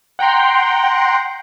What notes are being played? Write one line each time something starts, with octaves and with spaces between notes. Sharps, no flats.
F#5 G5 A#5 C6